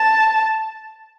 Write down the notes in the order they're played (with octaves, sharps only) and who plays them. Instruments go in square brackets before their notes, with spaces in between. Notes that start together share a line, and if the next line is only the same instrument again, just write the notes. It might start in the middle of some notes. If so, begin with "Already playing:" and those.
Already playing: [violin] A5